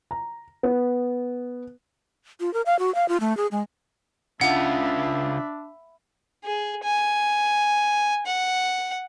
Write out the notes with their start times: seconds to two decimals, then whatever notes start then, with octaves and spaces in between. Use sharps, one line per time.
0.11 A#5
0.63 B3
2.40 F4
2.54 A#4
2.66 F5
2.79 F#4
2.95 F5
3.08 F4
3.20 A3
3.37 G#4
3.52 G#3
4.41 C#3 D4 F4 E5 F#5 B5
6.44 G#4
6.83 G#5
8.26 F#5